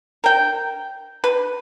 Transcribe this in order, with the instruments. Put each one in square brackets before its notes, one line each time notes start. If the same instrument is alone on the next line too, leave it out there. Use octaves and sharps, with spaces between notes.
[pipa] A#4 G5
B4